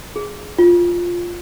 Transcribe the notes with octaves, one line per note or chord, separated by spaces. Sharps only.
G#4
F4